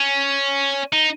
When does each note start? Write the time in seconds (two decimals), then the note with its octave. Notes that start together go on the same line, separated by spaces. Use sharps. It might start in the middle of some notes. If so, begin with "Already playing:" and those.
Already playing: C#4
0.93 D#4